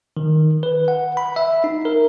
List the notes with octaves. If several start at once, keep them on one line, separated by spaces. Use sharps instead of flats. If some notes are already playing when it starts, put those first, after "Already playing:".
D#3
B4
F#5
B5
E5
D#4
A#4